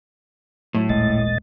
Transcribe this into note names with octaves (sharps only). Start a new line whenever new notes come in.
A2 F#3
D#1 A1 A#2 G#3 D#5 A6